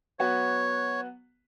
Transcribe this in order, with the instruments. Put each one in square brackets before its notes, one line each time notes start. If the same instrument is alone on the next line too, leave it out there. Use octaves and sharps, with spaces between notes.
[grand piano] F#3 B3 F#4 [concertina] C#5